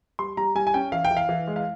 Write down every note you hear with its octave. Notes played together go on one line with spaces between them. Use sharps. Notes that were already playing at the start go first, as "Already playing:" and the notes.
G3 C6
G3 A#5
G3 G#5
G#5
C#4 G5
E3 F5
G5
E3
F5
E3
G#3
F5